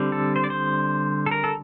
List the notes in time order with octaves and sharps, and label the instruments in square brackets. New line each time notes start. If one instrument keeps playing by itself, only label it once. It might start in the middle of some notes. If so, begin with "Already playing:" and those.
Already playing: [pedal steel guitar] D3 G3 C4
A4
C5
D5
C5
A4
A#4
A4